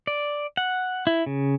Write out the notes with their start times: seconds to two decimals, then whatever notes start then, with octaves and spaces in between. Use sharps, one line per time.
0.07 D5
0.57 F#5
1.07 E4
1.26 C#3